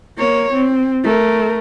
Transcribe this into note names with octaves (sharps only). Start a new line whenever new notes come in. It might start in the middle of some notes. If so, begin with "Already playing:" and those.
A#3 C#5
C4
A3 A#4